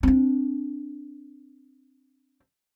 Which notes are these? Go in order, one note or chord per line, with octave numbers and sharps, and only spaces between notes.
C4 D4